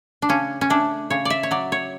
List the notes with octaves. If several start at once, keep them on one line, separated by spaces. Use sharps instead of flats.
D4
C#3 C#4
C#4
A3 D4
C#3 C#5
D5 E5
C#5
F#3 D5
C#5